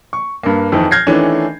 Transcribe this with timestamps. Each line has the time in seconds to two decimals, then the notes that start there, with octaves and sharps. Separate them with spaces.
0.13 C#6
0.43 G2 A#3
0.72 F2 D#3 E3 C4
0.91 F6 G6 G#6 A#6 C7
1.07 D#3 E3 A3 C#4 D4